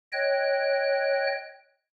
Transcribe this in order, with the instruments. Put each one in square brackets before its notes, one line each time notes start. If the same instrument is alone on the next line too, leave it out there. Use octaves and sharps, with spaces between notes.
[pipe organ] C#5 D#5 G5 F#6